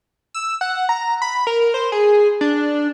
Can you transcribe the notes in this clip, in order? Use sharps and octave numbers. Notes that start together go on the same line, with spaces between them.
E6
F#5
A#5
B5
A#4
C5
G#4
D4